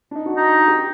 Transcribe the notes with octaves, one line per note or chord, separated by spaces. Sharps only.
D4
D#4
F#4
D#4
G4